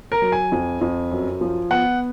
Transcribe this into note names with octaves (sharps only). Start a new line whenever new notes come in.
A#4
F#3
G#5
F2
F2
F#2
F3
B3 F#5